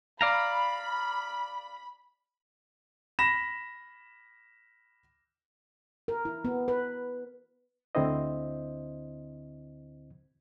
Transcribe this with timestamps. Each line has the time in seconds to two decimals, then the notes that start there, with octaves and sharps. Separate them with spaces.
0.21 D5 F5 A#5 B5
3.19 B5 A#6 E7
6.08 A#4
6.25 E4
6.45 B3
6.68 B4
7.95 D2 D3 C4 E4 C5 D#5